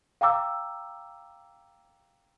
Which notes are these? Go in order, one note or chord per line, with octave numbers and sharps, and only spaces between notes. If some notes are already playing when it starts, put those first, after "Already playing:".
F5 G5 A#5 D6 E6